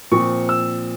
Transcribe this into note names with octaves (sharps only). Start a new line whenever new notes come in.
A#2 F3 C4 C#6
E6